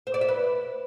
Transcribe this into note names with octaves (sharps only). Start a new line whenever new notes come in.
C5
D5
E5
B4